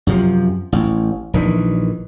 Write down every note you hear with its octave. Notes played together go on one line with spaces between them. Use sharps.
F#2 C3 F3
A1
A#1 D#3 E3